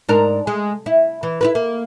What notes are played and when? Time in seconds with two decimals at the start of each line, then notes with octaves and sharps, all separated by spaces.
0.08 G#2 D4 A#4
0.47 G#3
0.86 E4
1.23 E3
1.41 E4 F#4 B4
1.55 A#3